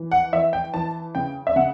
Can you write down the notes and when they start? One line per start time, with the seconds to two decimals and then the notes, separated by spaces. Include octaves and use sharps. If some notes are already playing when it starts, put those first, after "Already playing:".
Already playing: E3
0.11 F#5
0.32 E3 E5
0.53 G5
0.74 E3 A5
1.15 C#3 G5
1.47 E5
1.56 C#3 F#5